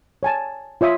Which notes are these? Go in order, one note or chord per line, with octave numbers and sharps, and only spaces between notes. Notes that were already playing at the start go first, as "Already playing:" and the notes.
C#5 G#5 A5
F4 C#5 E5 D#6